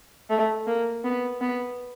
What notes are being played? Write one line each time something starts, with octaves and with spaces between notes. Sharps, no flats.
A3
A#3
B3
B3